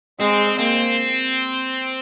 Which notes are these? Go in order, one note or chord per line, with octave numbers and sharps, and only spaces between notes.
G#3 C4
A#3 C4